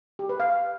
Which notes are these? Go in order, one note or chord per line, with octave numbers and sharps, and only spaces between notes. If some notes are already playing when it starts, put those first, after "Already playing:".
G4
B4
F5